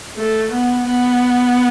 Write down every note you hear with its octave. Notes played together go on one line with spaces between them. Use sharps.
A3
B3
B3